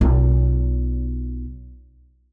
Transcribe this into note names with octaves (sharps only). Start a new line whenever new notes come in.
B1 F4